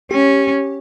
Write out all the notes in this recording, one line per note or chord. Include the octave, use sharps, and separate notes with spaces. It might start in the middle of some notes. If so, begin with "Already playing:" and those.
C#4 G4